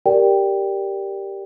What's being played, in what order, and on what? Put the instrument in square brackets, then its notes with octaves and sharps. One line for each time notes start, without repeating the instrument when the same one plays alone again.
[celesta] G4 A#4 D5 G5